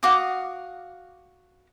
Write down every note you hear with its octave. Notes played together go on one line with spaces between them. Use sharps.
F#4 F5 D6 D#6